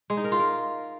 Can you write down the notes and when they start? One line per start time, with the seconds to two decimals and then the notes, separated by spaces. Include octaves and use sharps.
0.10 G#3
0.17 D#4
0.24 A#4
0.32 F4
0.39 A#4